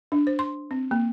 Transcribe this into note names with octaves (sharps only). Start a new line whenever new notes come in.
D4
C5
C6
C4
A#3